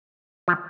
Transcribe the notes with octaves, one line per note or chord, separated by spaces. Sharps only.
F3